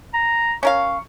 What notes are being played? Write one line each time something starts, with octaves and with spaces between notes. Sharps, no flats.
A#5
C#4 A#4 F5 C#6